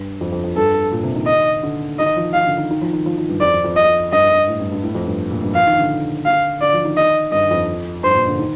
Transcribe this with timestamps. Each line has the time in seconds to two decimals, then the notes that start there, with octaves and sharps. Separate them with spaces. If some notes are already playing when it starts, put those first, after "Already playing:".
Already playing: G2
0.21 F2
0.32 F2
0.44 F2
0.56 G2 A4
0.92 A#2
1.03 C3
1.16 D#3
1.27 D#5
1.63 D3
1.99 D#3 D#5
2.16 F3
2.34 D#3 F5
2.47 D3
2.58 D#3
2.70 D#3
2.81 F3
2.93 D#3
3.06 F3
3.17 D#3
3.29 G2
3.40 F2 D5
3.53 F2
3.64 F2
3.76 D#5
4.12 G2 D#5
4.48 A2
4.59 G2
4.72 G2
4.83 A2
4.95 F2
5.07 G2
5.31 A#2
5.43 G2
5.55 F3 F5
5.67 D#3
5.79 D3
6.26 F5
6.61 D3 D5
6.73 F3
6.85 D#3
6.97 D#5
7.32 G2 D#5
7.51 F2
8.04 G2 C5
8.15 A#2
8.28 D3
8.39 D#3